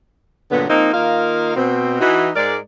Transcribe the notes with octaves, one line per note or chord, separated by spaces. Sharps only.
G2 A#2 D3 F#3 B3
F3 A#3 C4 D#4
D#3 A#3 F4 A#4 D#5 F5
B2 C4
E3 D#4 F#4
G#2 G#3 A#4 D5